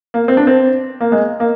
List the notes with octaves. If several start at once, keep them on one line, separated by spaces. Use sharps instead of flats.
A#3
C4
D4
C4
A#3
G#3
A#3